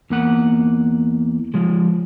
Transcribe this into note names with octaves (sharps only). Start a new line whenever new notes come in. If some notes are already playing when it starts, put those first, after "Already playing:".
E2 A#3 F#5
F3 G#3